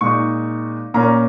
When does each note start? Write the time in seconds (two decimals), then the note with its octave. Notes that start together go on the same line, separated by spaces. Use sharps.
0.01 A#2 G#3 D#4 C#6
0.94 A#2 A#3 C#4 A#5